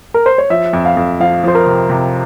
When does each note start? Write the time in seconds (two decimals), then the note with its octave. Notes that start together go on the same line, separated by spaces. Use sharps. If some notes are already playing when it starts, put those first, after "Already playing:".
0.14 A#4
0.26 C5
0.38 C#5
0.50 F3 E5
0.73 F2
0.85 F5
0.97 F2
1.20 F3 F5
1.44 F3 C5
1.55 A#4
1.67 C3
1.90 C3